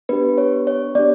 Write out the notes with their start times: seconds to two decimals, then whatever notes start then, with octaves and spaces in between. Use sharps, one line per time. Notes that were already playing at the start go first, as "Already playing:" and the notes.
0.09 B3 D4 G4 B4
0.38 C#5
0.67 C#5
0.95 B3 D4 G4 D5